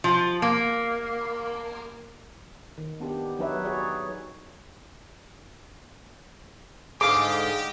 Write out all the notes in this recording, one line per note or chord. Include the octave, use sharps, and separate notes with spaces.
F3
A#3
D#3
B3 D4 G4
F#3 D4 D#4 B4 C#5 E5
F#4 G#4 C#5 D5
G#2 D3 G4 G#4 D#5 F5 D6